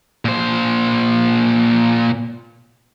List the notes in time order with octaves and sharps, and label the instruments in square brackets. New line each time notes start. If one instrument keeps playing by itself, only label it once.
[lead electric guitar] A#2 C5